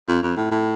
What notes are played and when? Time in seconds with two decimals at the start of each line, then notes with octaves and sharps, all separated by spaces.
0.08 F2
0.23 F2
0.37 A2
0.51 A2